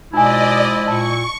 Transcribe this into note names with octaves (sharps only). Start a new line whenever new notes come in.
B2 F3 G#3 D#4 E4 D5 D#5 G#5
A#2 A5 C#6